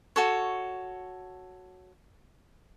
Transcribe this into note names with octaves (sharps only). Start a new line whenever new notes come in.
F#4 A4 C#5